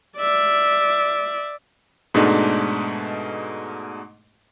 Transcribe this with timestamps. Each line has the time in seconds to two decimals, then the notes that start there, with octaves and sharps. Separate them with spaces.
0.17 D5 E5
2.14 G#2 B2 G#3 A3 D4 D#4